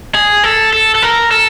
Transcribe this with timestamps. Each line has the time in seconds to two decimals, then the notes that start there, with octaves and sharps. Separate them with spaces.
0.15 G#4
0.44 A4
0.73 A4
0.95 A4
1.02 A#4
1.31 A4